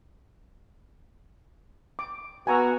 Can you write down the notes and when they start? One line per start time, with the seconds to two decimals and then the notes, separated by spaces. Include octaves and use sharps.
1.99 D6
2.47 B3 F#4 G#5 A#5 E6